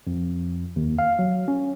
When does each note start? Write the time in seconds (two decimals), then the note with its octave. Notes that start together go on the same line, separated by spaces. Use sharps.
0.07 F2
0.76 D#2
0.99 F5
1.19 F#3
1.48 C#4